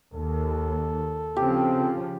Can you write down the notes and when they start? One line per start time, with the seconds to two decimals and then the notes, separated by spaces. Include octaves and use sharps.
0.13 D#2 A4
1.36 C#3 F3 C4 G4